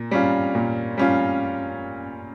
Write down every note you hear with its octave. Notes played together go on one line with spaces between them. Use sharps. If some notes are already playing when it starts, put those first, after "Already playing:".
Already playing: A#2
G3 C#4 F4
A#2
G3 C#4 F4